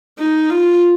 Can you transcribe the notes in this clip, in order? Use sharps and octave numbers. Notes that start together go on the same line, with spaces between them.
D#4
F4